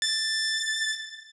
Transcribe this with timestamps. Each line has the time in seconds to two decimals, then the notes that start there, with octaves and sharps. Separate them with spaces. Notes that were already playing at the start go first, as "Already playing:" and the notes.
0.02 A6